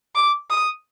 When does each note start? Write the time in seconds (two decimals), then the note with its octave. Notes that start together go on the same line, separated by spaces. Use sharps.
0.15 D6
0.51 D#6